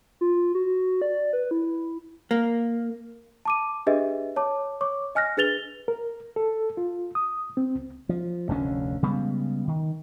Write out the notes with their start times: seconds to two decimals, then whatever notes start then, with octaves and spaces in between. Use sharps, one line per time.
0.21 F4
0.55 F#4
1.02 D5
1.33 B4
1.51 E4
2.31 A#3
3.45 A5 D6 D#7
3.87 D4 G4 G#4 B4 D#5 E5
4.36 C#5 A5 D6
4.81 C#5 C#6 D6
5.15 D#5 G#5 F6 F#6 A#6
5.37 D4 G#4 B4 A6 F7 G7
5.88 A#4
6.36 A4
6.77 F4
7.15 D#6
7.57 C4
7.75 C#2
8.09 F3
8.49 F1 D2 D3 C#4
9.03 C#3 G3 G#3 B3
9.68 D#3